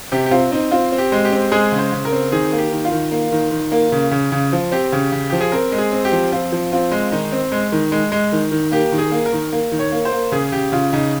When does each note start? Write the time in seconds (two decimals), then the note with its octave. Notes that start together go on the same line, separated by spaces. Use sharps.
0.12 C3 G4
0.26 G4
0.31 C4 F4
0.52 C4 D#4
0.71 C4 F4
0.92 C4
0.98 G4
1.12 G#3
1.25 G4
1.32 C4
1.52 G#3 G#4
1.72 C#3
1.78 C5
1.92 C#3
2.05 A#4
2.12 C4
2.32 D#3 G#4
2.53 A#3
2.58 G4
2.72 D#3
2.85 F4
2.92 D#3
3.11 A#3
3.32 D#3
3.52 D#3
3.72 A#3
3.92 C#3
4.11 C#3
4.32 C#3
4.53 F3
4.72 C4 G4
4.92 C#3
5.12 C#3
5.30 F3 G4
5.41 G#4
5.52 C4 A#4
5.72 G#3
5.78 G#4
5.92 C4
6.05 G4
6.12 F3
6.32 C4 F4
6.52 F3
6.72 C4 F4
6.91 G#3
7.12 D#3 D#4
7.32 C4
7.52 G#3
7.72 D#3
7.92 G#3
8.12 G#3
8.32 D#3
8.52 D#3
8.72 A#3 G4
8.92 D#3
8.98 G#4
9.12 A#3
9.26 A#4
9.33 D#3
9.52 A#3
9.72 D#3
9.79 C#5
9.92 A#3
10.05 C5
10.12 A#3
10.32 C#3 G#4
10.52 C#3 G4
10.72 C#3 F4
10.93 C#3 D#4